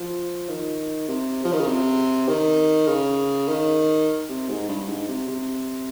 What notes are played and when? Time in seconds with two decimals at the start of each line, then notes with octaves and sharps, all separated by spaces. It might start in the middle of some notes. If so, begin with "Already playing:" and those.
Already playing: F3
0.48 D#3
1.08 C3
1.45 F3
1.53 D#3
1.60 C#3
1.68 C3
2.28 D#3
2.88 C#3
3.48 D#3
4.29 C3
4.49 G#2
4.68 G2
4.89 G#2
5.08 C3
5.28 C3